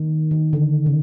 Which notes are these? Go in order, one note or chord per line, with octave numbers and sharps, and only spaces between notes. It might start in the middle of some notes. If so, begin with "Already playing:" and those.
Already playing: D#3
D#3
D3
C#3